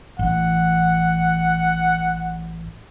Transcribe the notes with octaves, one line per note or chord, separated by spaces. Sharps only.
A1 F#5